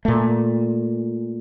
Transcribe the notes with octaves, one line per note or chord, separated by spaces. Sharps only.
A#2 A3